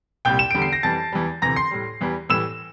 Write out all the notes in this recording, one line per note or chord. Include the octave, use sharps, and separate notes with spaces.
C2 A#2 G3 G5 G6
E7
E2 D3 G3 D7
C7
A#6
F2 E3 G3 A5 A6
E2 E3 G3
D2 C3 E3 A#5 A#6
C6 C7
A2 G3
E2 E3 G3
A2 E3 G3 E6 E7